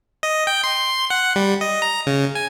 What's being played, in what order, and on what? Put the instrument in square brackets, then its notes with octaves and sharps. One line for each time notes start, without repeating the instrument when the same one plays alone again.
[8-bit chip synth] D#5
G5
C6
F#5
G3
D#5
A#5
C#3
G#5